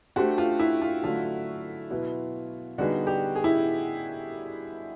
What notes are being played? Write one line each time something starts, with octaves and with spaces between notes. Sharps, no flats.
A3 D4 F#4 G4 C5
F4
E4
F4
D3 F#3 A3 F4
B2 F#3 B3 E4
D3 G3 B3 D#4 F#4 G#4
G4
G#4
E4